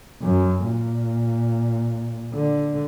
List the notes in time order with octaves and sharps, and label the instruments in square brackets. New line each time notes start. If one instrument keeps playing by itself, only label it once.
[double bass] F#2
A#2
D3